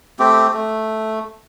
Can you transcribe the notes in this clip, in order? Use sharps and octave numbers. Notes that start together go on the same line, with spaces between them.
A3 C4 G4
A3